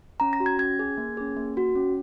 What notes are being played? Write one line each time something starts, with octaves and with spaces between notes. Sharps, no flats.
C#4 A#5
A#6
F#4
G#6
C#4 G#6
G#4
A#3
C#4 G#4
A#3
F#4
C#4